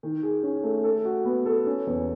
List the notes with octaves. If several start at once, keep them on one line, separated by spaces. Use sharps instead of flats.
D#3
G#4
C#4
A3
A4
F#4
B3
A4
C#4
E2